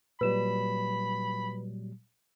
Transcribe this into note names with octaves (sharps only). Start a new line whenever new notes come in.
A#2 F#3 G3 B4 B5 E7